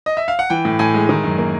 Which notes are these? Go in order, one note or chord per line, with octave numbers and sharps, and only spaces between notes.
D#5
E5
F5
F#5
E3 G5
A2
A2 G#5
G#3
D#3
F#2
A#3